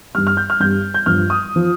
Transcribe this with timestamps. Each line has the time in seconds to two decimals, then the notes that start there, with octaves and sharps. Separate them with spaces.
0.15 G3 F6
0.18 G2
0.27 F6
0.37 G6
0.50 F6
0.60 G2 G3 G6
0.94 G6
1.06 G2 F3 F6
1.30 D#6
1.56 F3